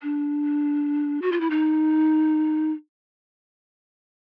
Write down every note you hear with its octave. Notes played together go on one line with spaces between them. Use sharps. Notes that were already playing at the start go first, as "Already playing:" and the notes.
D4
F#4
F4
E4
D#4